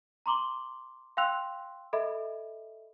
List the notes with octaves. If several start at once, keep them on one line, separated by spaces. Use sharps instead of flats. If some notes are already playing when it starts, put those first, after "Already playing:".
A#5 C6 D6 F#7 G7
F5 G5 C6 E6 F#6 F7
A4 D#5 E5 B5